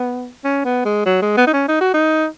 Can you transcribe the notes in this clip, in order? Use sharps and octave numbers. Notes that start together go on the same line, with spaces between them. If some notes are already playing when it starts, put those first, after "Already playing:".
Already playing: B3
C#4
B3
G#3
F#3
G#3
B3
D#4
C#4
D#4
F#4
D#4